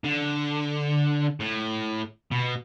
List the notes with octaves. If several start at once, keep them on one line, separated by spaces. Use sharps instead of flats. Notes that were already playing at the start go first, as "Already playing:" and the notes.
D3
A2
B2